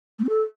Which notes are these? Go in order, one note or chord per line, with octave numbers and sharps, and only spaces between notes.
A3
C4
A4